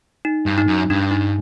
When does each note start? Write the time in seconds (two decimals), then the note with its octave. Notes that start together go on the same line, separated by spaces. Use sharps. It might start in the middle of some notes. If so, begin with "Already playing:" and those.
0.25 D#4
0.46 G2
0.58 D#4
0.68 F#2
0.90 G2 D4
1.11 D#4